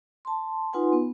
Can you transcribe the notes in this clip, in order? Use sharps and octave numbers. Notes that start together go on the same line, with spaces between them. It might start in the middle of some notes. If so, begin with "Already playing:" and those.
A5 C6
D#4 F4 B4 F#5 G#5 C6
B3